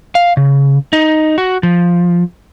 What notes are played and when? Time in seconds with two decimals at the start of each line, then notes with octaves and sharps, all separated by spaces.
0.15 F5
0.37 C#3
0.93 D#4
1.38 F#4
1.63 F3